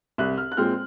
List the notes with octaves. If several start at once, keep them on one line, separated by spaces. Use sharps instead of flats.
C2 F#6
F6
F#6
A#2 G#3 C4 F6